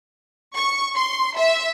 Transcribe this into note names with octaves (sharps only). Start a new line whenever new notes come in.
C#6
C6
E5